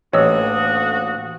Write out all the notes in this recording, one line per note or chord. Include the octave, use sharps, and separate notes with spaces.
A1 D2 A#3 F#4 C#5 D#5 D#6 E6